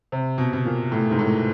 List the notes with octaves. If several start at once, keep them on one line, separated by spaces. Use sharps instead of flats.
C3
B2
B2
A#2
A2
G#2
A2